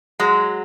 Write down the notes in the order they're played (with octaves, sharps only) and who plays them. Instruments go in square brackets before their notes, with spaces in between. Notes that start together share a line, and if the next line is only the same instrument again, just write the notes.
[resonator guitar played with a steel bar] F#3 G#3